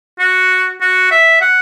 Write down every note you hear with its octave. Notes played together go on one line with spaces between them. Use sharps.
F#4
F#4
E5
F#5